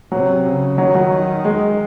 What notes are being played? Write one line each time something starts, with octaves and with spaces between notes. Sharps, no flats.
C3 F#3
C#3
D#3 F#3
F#3
G#3